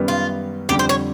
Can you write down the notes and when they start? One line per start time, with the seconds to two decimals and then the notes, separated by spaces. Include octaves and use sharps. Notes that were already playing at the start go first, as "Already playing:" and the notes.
Already playing: F#2 D#3 G3 B3
0.08 F4
0.69 F2 D3 G3 G4
0.79 C5
0.89 C#5